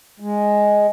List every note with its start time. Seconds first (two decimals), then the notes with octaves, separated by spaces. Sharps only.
0.20 G#3